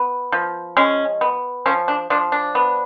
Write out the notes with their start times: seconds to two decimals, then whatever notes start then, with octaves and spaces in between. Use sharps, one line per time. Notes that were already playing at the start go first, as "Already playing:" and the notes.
Already playing: B3
0.32 F3
0.77 G#3 C#4
1.21 B3
1.66 F3 C#4
1.88 D4
2.10 F3 D4
2.32 D4
2.55 B3